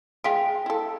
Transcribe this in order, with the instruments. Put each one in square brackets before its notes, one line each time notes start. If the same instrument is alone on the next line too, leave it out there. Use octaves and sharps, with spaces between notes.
[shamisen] G#3 F4 [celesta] G5 B6 D7
[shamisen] E4 A4